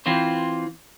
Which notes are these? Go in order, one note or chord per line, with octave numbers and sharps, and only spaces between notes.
E3 C4 F4 C5